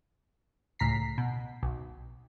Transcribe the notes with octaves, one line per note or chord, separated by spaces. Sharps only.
C#2 A2 A#5 B6 C7
B2
B1